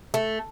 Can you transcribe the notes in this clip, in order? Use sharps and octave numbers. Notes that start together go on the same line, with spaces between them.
A3